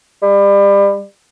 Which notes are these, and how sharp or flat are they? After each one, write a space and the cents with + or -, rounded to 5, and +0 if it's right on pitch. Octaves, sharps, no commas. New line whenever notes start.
G3 +30